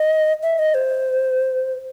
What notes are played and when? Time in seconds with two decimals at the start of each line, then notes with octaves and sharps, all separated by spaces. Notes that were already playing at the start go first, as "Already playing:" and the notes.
Already playing: D#5
0.43 E5
0.59 D#5
0.74 C5